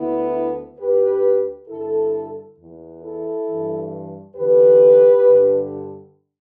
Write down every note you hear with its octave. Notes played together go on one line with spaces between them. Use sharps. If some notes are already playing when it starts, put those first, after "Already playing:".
Already playing: D2 D3 B3 E4
D2 D3 G4 B4
G2 D3 E4 A4
E2 E3
E4 A4
G2 E3
E2 D3 G4 B4
G2 D3